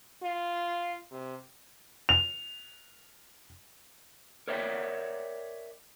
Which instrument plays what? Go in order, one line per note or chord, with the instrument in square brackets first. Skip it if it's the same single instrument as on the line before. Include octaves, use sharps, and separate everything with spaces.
[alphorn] F4
C3
[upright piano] F7
[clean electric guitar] A#4 C#5 D5 E5 G5